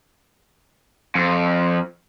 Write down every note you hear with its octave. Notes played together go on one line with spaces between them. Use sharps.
F2